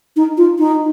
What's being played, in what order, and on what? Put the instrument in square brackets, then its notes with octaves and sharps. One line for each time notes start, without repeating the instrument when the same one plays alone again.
[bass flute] D#4
F4
D#4